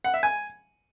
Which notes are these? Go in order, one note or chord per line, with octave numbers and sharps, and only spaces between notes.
F#5
E5
G#5